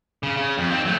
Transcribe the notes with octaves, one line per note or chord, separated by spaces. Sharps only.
C#3
C#3
F2
C4 D#4
F#3 A3